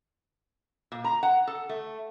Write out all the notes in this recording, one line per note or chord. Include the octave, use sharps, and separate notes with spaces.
A#2
A#5
F#5
A4
A3